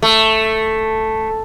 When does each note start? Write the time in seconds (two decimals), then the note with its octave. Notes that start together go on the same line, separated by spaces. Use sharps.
0.02 A3